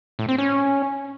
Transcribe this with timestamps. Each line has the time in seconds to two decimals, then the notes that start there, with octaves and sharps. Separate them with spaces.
0.19 A2
0.29 C4
0.38 C#4